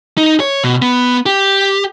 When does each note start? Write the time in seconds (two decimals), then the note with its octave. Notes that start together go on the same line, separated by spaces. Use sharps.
0.18 D#4
0.40 C#5
0.64 B2
0.82 B3
1.26 G4